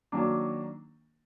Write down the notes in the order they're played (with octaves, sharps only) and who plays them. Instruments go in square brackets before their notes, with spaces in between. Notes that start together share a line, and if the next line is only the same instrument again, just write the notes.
[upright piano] D#3 F#3 A#3 D4